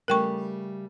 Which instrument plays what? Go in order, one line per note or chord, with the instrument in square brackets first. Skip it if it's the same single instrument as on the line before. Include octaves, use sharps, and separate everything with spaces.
[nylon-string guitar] C#3 G3 A3 [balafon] A#4 G5 C#6